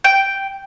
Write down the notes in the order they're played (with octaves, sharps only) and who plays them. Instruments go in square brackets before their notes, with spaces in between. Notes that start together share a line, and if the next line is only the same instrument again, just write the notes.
[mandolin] G5